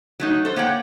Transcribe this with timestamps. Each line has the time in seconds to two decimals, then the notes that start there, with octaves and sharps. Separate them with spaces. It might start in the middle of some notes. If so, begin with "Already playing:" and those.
0.20 F#3 A3 D#4
0.45 A4 C5
0.56 A#3 C#5 F#5 G5